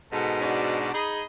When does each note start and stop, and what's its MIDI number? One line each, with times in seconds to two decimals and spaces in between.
0.12 0.91 44
0.12 0.91 47
0.12 0.37 69
0.41 0.92 62
0.41 0.92 66
0.41 0.92 74
0.94 1.21 63
0.94 1.21 68
0.94 1.23 75
0.94 1.23 83